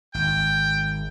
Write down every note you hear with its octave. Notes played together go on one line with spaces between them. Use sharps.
G#1 G5